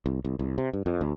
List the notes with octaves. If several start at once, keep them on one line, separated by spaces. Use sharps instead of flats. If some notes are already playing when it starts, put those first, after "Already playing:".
C2
C2
C2
C3
G2
F2
D2